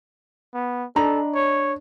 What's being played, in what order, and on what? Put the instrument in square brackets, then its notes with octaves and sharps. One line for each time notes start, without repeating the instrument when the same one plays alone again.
[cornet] B3
[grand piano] D4 [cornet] A4 [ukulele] D#5 A#5 B5
[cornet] C#5